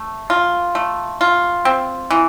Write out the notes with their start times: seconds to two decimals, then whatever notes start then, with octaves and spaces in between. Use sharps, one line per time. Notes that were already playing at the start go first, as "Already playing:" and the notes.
Already playing: A3
0.30 F4
0.75 A3
1.21 F4
1.65 C4
2.11 E3